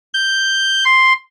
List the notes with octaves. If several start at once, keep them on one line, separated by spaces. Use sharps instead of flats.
G6
C6